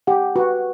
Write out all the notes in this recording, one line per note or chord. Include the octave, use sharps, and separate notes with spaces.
G4 F#5
F#4 B4